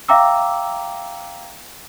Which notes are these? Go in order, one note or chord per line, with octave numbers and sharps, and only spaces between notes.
E5 F5 G5 A#5 D6 E6